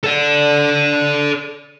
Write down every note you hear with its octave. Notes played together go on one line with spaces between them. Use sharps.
A4 D5